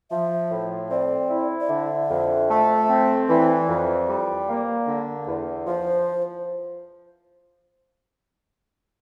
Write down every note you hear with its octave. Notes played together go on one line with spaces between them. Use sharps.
F3 E5
A2
C4 D5
E4
D5
D3 E5
F2
A3
C4
E3 D5
F2
G3
A#3
D3
E2
F3 C5